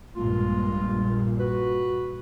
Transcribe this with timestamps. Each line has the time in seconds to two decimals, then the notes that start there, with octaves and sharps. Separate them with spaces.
0.16 A#1 G2 A#2 G#3 A#3 F4
1.39 F#4 B4